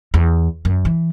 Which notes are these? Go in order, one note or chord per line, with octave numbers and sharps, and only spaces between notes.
E2
F#2
E3